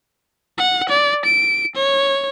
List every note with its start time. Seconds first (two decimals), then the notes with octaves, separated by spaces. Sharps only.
0.58 F#5
0.89 D5
1.25 D7
1.75 C#5